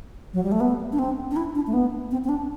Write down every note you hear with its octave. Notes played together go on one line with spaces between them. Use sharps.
F#3
G3
A3
B3
D4
C4
D4
E4
D4
A3
B3
C4
C4
D4